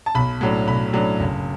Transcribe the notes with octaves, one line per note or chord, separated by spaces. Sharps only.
A5
B1 B5
A2 F#3 D4
B1 B5
A2 F#3 D4
F#1